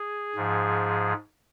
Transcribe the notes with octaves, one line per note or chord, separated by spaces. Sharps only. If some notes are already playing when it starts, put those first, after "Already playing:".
Already playing: G#4
G#2 F3